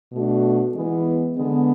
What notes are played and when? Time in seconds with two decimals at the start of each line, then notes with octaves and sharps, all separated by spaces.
0.10 B2 A3 D4 F#4
0.74 E3 G#3 B3
1.36 D3 G#3 B3